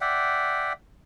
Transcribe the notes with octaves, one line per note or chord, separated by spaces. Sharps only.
D5 E5 F#5 G5